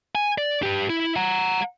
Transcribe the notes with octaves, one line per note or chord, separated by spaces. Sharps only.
G#5
D5
G4 B4
E4
F#5 A#5